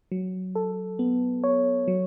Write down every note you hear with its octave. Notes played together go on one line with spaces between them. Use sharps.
F#3
A4
B3
C#5
F#3